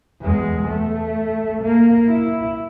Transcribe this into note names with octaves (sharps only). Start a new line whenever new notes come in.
E2 G#3
A3
A#3
E4